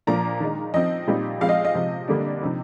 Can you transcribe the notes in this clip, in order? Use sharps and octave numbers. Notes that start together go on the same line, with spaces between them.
A#2 F3 A#3 D4 A#5
D#3 G#3 D#4
F3 C4 D#4 D#5
A#2 G3 C4 D#4
F3 G#3 C4 F5
D#5
D#5
C3 F3 C4
D3 G3 A#3 D4
C3 F3 C4 D#4